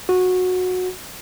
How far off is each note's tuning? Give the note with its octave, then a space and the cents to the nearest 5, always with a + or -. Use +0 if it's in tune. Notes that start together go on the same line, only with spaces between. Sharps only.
F#4 -15